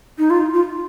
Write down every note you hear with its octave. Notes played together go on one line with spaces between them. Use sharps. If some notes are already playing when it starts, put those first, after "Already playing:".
D#4
F4
F4